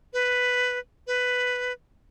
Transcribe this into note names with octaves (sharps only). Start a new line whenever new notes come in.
B4
B4